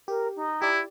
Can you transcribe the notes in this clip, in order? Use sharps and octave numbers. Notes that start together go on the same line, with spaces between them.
G4 A#4
D#4
E4 G4 D5